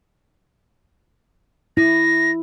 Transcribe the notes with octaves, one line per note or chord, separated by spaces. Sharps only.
E4 A#6